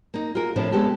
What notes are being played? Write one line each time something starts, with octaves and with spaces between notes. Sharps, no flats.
A#3 D#4
F4 F#4 G#4 A#4
A2 C3 F3 A3 D4
G#3 B3 G4 A4